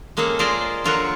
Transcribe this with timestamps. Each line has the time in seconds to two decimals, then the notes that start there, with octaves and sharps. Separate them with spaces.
0.17 G#3 A#3 C#4 G#4 A4
0.39 F4 G#4 A#4 C5 D5 D#5
0.84 D3 F#3 F4 A#4 C#5 F#5